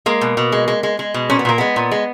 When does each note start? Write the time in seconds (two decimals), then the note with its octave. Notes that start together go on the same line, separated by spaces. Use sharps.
0.06 G#3 A#3
0.21 B2
0.37 B2
0.52 G#3
0.68 G#3
0.83 G#3
0.99 G#3
1.14 B2
1.30 A#2 C#4
1.39 B3
1.45 A#2 A#3
1.58 G#3 B3
1.76 A#2
1.91 G#3